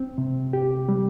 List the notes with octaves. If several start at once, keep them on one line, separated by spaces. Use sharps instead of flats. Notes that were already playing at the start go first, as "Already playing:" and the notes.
Already playing: C4
C3
G4
G3